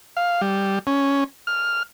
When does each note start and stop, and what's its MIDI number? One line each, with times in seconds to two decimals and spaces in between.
0.17 0.41 77
0.41 0.79 55
0.87 1.24 61
1.47 1.83 89